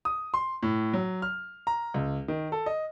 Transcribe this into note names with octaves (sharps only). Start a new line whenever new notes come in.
D#6
C6
A2
F#3
F6
A#5
C#2
D#3
A4
D#5